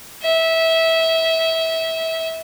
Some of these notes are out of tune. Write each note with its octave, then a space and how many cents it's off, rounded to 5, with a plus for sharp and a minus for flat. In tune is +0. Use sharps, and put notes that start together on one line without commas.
E5 -20